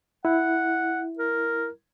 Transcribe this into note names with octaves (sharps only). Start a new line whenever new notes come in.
E4 F#5
A#4